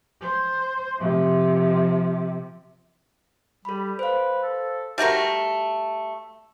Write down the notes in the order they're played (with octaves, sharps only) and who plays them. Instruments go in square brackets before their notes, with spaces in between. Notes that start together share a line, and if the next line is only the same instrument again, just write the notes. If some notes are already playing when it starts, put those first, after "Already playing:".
[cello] C5
C3 F3
[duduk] G3 [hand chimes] A4 B5
[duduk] B4 [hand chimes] C5 F5
[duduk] A4
[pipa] G3 A3 F#4 A#4